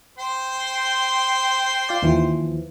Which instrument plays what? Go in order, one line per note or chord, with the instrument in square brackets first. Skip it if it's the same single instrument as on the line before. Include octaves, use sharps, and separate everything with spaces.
[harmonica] C5 G5 C6
[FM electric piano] F4 D5
D#2 E3 F3